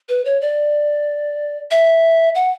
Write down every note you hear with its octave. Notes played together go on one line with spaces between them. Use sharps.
B4
C#5
D5
E5
F#5